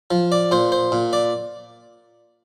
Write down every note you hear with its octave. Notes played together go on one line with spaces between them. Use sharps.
F3
D5
A#2 C5
C5
A#2
D5